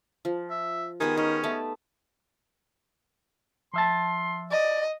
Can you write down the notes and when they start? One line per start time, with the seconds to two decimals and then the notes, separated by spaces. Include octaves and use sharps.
0.25 F3
0.50 E5
1.00 D#3 G#3 B3 G4 G#5
1.17 C#4 D#4
1.44 A3 B3 A5
3.74 F3 E5 A5 C6
4.51 D5 D#5